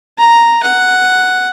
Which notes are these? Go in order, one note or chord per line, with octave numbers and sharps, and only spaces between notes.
A#5
F#5